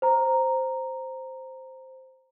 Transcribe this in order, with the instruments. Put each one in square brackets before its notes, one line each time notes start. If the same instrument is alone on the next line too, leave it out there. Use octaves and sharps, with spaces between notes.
[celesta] C5 A#5